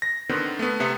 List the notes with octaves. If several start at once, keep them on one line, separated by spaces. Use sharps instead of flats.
A#6
D3 D#3 B3 C4
A3 B3
C3 B3 E5 C#7